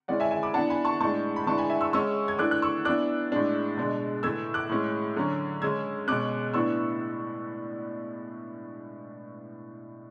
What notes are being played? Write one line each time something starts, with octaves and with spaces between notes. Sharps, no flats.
E3 G#3 C#4 D5 F#5
E5 G#5
E5 G#5
B5 D6
E3 B3 D4 F#5 A5
G#5 B5
A5 C#6
A2 G#3 D4 A5 C#6
B5
E3 G#3 D4 A5 C#6
G#5 B5
E5 G#5
C#6 E6
C#3 G#3 C#4 C#6 E6
G#6
E3 A3 D4 D6 F#6
F#6
C#6 E6
E3 B3 D4 D6 F#6
A2 G#3 D4
B2 G#3 D4
A2 E3 A3 E6 G#6
D6 F#6
A2 G#3 C#4
D3 F#3 C#4
C#3 G#3 C#4 E6 G#6
B2 G#3 C#4 D6 F#6
A2 E3 B3 D4 C#6 E6